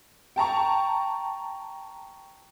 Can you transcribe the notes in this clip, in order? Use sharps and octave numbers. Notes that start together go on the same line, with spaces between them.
G5 A5 A#5 C#6